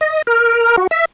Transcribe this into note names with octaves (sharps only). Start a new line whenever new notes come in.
D#5
A#4
F#4
E5